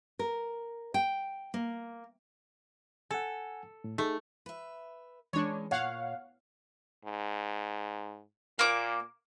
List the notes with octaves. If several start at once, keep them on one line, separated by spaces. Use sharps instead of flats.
A#4
G5
A#3
A4 F#5 G#5
A2
A3 D#4 G#4
B4 E5
E3 G#3 C#4 D4 C#5
A#2 C#5 F5 F#5
G#2
A#2 A#3 D6